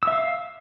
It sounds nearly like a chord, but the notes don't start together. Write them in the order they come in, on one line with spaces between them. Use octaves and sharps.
E6 E5 F5